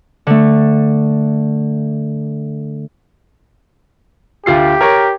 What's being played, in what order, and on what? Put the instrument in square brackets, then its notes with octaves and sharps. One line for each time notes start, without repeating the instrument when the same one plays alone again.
[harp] D3 A3
[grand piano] D2 F4 C7 [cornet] G4
[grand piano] A#4 C#5